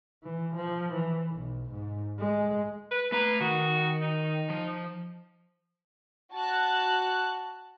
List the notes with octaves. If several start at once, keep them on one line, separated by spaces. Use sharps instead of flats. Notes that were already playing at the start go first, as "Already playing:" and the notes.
E3
F3
E3
B1
G#2
G#3
B4
A3 B4 A#5
D#3 F#4
D#4
F3
F#4 A5 F#6